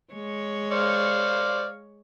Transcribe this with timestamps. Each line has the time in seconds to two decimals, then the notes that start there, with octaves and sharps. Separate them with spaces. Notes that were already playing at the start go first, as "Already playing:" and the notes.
0.13 G#3 C#5
0.72 C5 D5 F5